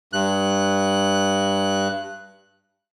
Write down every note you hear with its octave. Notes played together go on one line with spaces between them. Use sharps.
G2 F#6